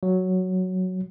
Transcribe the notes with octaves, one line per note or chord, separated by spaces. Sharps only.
F#3